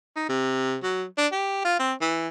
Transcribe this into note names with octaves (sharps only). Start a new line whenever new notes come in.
D#4
C3
F#3
D4
G4
F4
C4
E3